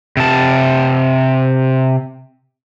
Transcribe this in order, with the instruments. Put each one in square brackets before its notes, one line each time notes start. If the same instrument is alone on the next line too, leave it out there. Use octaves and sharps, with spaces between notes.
[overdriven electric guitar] C3 A5